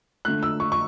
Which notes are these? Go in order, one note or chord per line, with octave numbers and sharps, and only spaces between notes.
D3 A3 F#6
E6
C#6
C#6